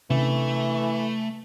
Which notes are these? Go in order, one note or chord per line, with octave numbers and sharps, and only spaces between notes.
C3 E3 A3 C#4 D4